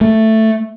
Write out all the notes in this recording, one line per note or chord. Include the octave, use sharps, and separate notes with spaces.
A3